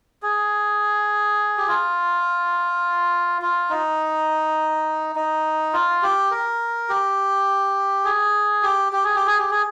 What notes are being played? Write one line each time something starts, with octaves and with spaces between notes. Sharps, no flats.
G#4
G4
F4
F4
D#4
D#4
F4
G4
A#4
G4
G#4
G4
G4
G#4
G4
G#4
G4
G#4